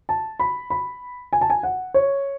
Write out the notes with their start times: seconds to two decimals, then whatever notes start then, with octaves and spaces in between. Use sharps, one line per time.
0.09 A5
0.40 B5
0.70 B5
1.33 G#5
1.41 A5
1.50 G#5
1.63 F#5
1.94 C#5